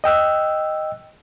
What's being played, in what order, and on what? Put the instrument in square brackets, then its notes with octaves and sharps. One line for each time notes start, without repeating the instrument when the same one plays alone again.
[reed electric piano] D#5 G5 E6 F#6